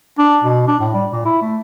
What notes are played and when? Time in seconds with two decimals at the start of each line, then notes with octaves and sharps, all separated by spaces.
0.19 D4
0.44 B2
0.68 D4
0.80 A2
0.94 G3
1.12 A#2
1.25 E4
1.42 A3